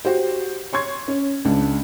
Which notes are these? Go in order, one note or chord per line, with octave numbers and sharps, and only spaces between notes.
F#4 G4 C5
C#5 C6 C#6 G#6
C#4
C#2 D4